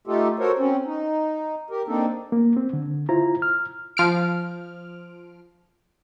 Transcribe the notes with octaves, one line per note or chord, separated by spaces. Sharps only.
A3 D#4 F4 G4 A4
F#4 A4 A#4 C5 C#5
C4 C#4
D#4
G4 A#4
A#3 C4 D4 D#4 A4
A#3
C4
D3
E4 F4 C5 A#5
F6
F3 F6 D7